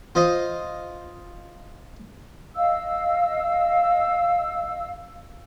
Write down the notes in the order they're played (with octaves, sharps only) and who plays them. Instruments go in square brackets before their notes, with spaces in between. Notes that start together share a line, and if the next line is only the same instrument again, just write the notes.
[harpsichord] F4 C5 D#5
[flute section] D#5 F5 E6